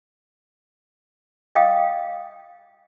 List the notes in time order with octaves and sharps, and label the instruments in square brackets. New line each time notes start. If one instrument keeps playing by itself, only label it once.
[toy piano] D#5 F5 G5 D#6